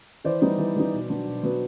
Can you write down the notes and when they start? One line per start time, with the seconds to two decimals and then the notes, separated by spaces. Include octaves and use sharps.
0.24 E3 C5 D5
0.42 G3 B3 D#4
0.58 E3
0.76 G3 B3 D#4
0.93 B2
1.09 F#3 B3 D4
1.27 B2
1.43 F#3 B3 D4